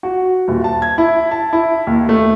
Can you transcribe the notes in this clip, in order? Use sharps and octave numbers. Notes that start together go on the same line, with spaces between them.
F#4
D#1
A5
G#6
E4
A5
E4
D#2
A3